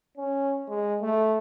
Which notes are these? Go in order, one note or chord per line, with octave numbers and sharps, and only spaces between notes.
C#4
G#3
A3